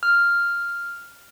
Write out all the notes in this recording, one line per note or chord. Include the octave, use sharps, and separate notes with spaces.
F6